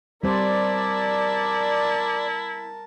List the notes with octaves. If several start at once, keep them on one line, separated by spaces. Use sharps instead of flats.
G3 C4 E4 A#4 C5 D5 A5